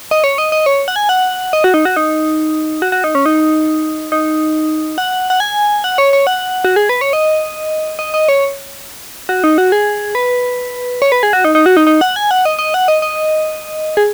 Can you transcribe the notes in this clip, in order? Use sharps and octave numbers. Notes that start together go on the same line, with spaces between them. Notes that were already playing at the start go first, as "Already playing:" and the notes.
D#5
C#5
D#5
D#5
C#5
F#5
G#5
F#5
D#5
F#4
D#4
F#4
D#4
F#4
F#4
D#4
C#4
D#4
D#4
F#5
F#5
G#5
F#5
C#5
C#5
F#5
F#4
G#4
B4
C#5
D#5
D#5
D#5
C#5
F#4
D#4
F#4
G#4
B4
C#5
B4
G#4
F#4
D#4
D#4
F#4
D#4
D#4
F#5
G#5
F#5
D#5
D#5
F#5
D#5
D#5
G#4